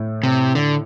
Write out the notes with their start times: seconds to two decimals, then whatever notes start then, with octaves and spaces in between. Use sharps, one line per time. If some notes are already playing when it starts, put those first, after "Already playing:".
Already playing: A2 A3
0.23 C3
0.55 D3